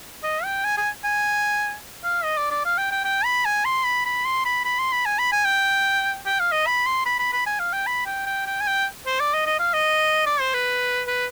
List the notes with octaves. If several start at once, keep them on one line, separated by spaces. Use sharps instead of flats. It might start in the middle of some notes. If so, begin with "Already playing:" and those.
D#5
G5
G#5
G#5
G#5
F5
D#5
D5
D5
F5
G5
G5
G5
B5
G#5
C6
B5
B5
C6
B5
B5
C6
B5
G#5
B5
G#5
G5
G5
F5
D#5
B5
C6
B5
B5
B5
G#5
F5
G5
B5
G5
G5
G5
G#5
G5
C5
D5
D#5
D#5
F5
D#5
D5
C5
B4
B4